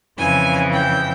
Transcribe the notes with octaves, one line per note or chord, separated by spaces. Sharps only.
F2 C#3 E3 G#5
G5